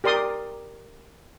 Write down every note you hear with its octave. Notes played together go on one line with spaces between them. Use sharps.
G4 A#4 D5 C6 D#6